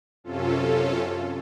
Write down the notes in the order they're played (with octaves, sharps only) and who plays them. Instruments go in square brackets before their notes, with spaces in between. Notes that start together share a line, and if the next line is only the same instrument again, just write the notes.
[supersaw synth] F#2 C3 C#4 F4 A4